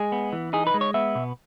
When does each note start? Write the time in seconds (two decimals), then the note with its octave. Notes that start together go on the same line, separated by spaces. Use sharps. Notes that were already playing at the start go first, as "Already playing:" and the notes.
Already playing: G#3 G#4
0.12 B3
0.33 E3
0.53 D#4 G#4
0.67 B4
0.74 G#3
0.81 C#5
0.94 B3 E5
1.15 B2